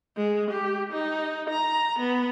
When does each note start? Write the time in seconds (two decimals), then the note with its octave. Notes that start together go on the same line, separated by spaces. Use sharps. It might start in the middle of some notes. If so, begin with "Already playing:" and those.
0.16 G#3
0.50 G4
0.92 D#4
1.50 A#5
1.99 B3